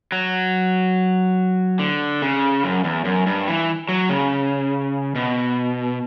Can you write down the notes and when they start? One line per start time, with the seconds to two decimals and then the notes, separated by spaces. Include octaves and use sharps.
0.12 F#3
1.79 D3
2.22 C#3
2.64 F#2
2.84 E2
3.05 F#2
3.27 G2
3.48 E3
3.89 F#3
4.10 C#3
5.15 B2